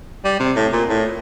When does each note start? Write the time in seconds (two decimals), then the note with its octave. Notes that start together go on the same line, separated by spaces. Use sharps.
0.25 G3
0.40 C3
0.56 A2
0.73 A#2
0.89 A2